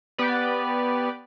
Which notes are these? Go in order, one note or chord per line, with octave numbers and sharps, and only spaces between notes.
B3 G4 B4 D5